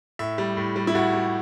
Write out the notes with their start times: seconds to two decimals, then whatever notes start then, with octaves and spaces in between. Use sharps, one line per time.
0.19 A2 E5
0.38 G3
0.57 A2
0.76 G3
0.87 E4
0.95 A2 F#4
1.13 G3